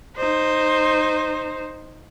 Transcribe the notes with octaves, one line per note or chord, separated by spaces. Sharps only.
D#4 C5